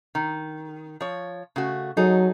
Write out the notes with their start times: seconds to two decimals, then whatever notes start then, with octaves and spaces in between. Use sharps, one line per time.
0.15 D#3
1.01 F3 C#5
1.56 C#3 A3 F#4
1.97 F#3 D#4 G#4 A4